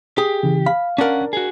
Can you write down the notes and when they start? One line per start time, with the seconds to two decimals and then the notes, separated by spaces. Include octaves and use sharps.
0.18 G4 G#4
0.43 C#3 E3
0.66 F5 B5
0.98 C#4 D4 A#4 F#5
1.33 F#4 G#4